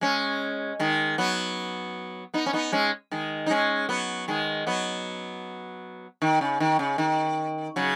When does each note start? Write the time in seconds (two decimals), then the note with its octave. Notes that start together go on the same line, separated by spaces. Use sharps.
0.01 G#3 C#4
0.80 D#3 G#3
1.18 F#3 B3
2.34 B3 D#4
2.46 C#4
2.53 B3 D#4
2.72 G#3 C#4
3.11 D#3 G#3
3.46 D#4
3.50 G#3 C#4
3.89 F#3 B3
4.28 D#3 G#3
4.67 F#3 B3
6.22 D#3
6.41 C#3
6.60 D#3
6.79 C#3
6.98 D#3
7.76 C#3 F#3